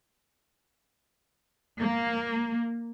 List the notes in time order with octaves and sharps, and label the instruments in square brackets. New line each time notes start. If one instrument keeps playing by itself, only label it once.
[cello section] A#3